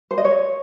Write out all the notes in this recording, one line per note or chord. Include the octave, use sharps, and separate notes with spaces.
C5
D#5
C#5